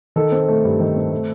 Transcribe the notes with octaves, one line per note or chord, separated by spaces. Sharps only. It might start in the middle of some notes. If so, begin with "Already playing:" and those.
D#3 A4
C4
A3
G2
D#3
C4
A3